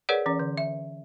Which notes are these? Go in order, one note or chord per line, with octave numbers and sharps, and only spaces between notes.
G#4 A#4 B4 C#5 D5 F#5
E3 C#4
D3
E5